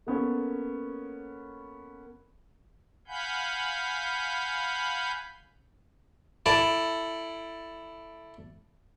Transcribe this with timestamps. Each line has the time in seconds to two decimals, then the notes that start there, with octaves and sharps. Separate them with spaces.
0.07 A#3 B3 C#4 A4
3.08 F5 F#5 G#5 B5 G6
6.46 E4 A4 D5